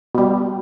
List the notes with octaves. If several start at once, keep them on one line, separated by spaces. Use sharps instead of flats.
B2 G3